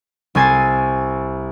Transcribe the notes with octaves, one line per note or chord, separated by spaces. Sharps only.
C2 C4 G#5 A6 C7